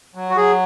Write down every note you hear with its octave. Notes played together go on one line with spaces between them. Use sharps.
F#3
F#4
F#3 G#4